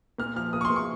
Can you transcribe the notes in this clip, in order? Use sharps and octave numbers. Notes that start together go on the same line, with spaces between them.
A#2 F6
F3 F6
A#2 D#6
C#6
C6
A#2
C#6